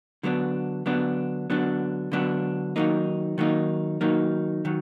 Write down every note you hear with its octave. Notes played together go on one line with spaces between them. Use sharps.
D3 F#3 B3 D4
D3 F#3 B3 D4
D3 F#3 B3 D4
D3 F#3 B3 D4
D#3 F#3 A#3 D#4
D#3 F#3 A#3 D#4
D#3 F#3 A#3 D#4
D#3 F#3